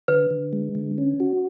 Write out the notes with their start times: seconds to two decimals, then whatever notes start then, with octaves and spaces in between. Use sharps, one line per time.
0.08 D3 B4
0.30 D3
0.53 G#3
0.75 D3
0.98 C#4
1.20 F#4